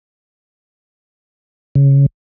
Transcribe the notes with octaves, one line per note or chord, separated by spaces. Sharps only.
C#3